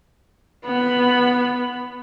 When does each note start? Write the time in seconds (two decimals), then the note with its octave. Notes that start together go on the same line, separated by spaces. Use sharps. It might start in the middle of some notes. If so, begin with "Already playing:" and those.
0.65 B3 B5